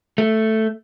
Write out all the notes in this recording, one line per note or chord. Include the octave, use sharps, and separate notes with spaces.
A3